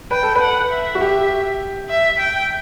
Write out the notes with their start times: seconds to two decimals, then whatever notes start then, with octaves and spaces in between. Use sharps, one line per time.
0.11 B4 G5
0.23 A4
0.35 B4
0.41 F#5
0.71 E5
0.95 F#4
1.01 G4
1.89 E5
2.19 G5